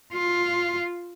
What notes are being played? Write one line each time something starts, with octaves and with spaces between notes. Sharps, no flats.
F4